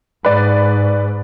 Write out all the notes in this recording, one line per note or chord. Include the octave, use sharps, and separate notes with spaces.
G#2 B4 D5